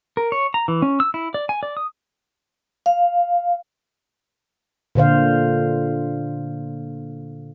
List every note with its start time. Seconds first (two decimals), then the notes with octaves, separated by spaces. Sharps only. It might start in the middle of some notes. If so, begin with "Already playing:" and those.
0.17 A#4
0.32 C#5
0.54 A#5
0.68 E3
0.82 C#4
1.00 E6
1.14 E4
1.34 D5
1.49 G#5
1.63 D5
1.77 D#6
2.86 F5
4.95 A#2 D3 C5 F5